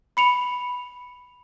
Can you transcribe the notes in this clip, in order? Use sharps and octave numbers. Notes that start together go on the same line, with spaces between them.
B5 C#7 F7